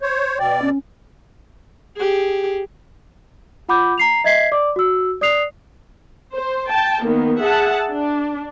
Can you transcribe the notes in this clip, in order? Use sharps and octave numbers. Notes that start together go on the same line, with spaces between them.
C5 C#5
B2 D5 G5
C#4
G4 G#4
F4 F#5 B5 D6 G6
A#5 C7 F7
D#5 E5 G#6 B6 C7
D5 D6
F#4 E6
D5 D#6 F#6 C7 F7
C5
G5 A5
D#3 A#3 B3
G#4 E5 F#5 A5
D4